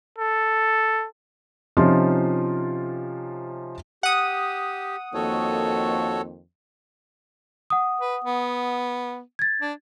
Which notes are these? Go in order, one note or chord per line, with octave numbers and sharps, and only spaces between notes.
A4
C3 F3 C#4 D#4 F4
G4 F#5 D#6
F2 D#3 A#3 F#4 A4 C#5
F#5 D#6
B4
B3
G#6 A6
D4